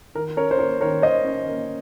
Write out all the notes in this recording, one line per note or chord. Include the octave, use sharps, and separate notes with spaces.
D#3 A#4
C#4 A#4 C#5
C5
A#3 A#4 C#5
D#3 A#4 C#5
D#3 C5 D#5
C#4
A#3